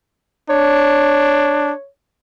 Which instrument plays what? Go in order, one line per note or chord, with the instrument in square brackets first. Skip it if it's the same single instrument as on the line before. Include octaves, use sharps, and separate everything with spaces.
[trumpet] D4 [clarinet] C#5